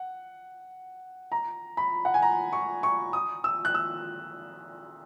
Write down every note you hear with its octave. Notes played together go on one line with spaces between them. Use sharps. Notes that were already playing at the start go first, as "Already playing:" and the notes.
Already playing: F#5
A#5
B5
F#5
G#5
A#5
C#6
C#6
D#6
E6
F#6
E6